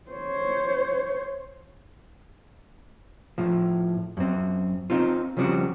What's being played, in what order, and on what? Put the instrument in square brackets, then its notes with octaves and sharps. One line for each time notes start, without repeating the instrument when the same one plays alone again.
[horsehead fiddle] C5 C#5
[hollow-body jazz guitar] A2 F3
F#2 C4
C4 D#4 F4
C#3 F3 G3 C4 F#4